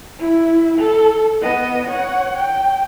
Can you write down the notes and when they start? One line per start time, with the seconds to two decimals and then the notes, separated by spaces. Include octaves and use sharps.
0.19 E4
0.78 A4
1.41 B3 D#5
1.87 C#5 F#5
2.37 G5